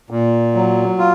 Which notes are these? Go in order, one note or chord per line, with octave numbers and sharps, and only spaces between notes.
A#2
F#3
F4